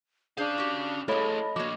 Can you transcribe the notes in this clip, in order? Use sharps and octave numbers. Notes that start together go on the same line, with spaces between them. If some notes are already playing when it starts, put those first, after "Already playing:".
C#4 D4 G#4 C5 F5
F#4 G4
A3 E4 G#4 A4 C#5 D#5 A5 B5
F3 A#3 F#4 C#5 D6